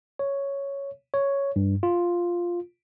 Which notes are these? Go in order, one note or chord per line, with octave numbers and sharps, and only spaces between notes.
C#5
C#5
G2
F4